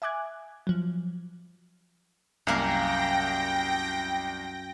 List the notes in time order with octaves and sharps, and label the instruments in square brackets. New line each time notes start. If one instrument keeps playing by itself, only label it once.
[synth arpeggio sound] E5 G#5 D6 F#6 G#6
F3 F#3
[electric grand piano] C2 [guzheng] F#2 A#3 F5 [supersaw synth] G5 A#6